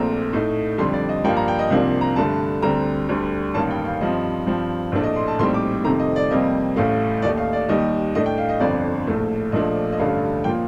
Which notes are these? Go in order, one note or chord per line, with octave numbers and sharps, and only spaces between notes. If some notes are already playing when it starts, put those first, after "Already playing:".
Already playing: A#1 A#2 A3 C4 A#5
A2 A3 D#4
F2 D3 G3 C6
D5
D#5
G2 F3 A#3 D4 G5
A#5
G5
D#5
C2 C3 F3 A#3 D4 F5
A#5
G2 D3 A3 A5
D2 D3 G3 C4 A#5
D2 D3 G3
A1 G2 D#3 G3 A#3 A5
G5
F5
G2 F3 C4 D#5
G2 F3 C4
A#1 A2 A3 D4
D#5
C6
A5
A#1 A2 G3 C4 D#4 C6
D6
F2 C3 D#3 A3 A#5
D#5
D5
F2 C3 G3 A#3 D#5
A1 A2 A3 F5
D#2 D#3 A3 D#4 D5
F5
D5
D#2 D#3 G3 D#5
A2 A3 D4 D#5
G5
F5
D#5
G1 F2 D3 D5
A#1 A2 A3
A#1 A#2 F3 A3 D4 D#5
D#5
A1 G2 D3 A3 F5
A#2 F3 A#3 G5